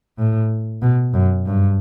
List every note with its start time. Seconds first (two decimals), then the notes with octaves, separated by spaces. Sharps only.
0.18 A2
0.82 B2
1.14 F#2
1.46 G2